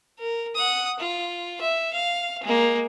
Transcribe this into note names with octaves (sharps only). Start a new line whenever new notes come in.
A#4
F#5 D#6
F4
E5
F5
G#3 A#3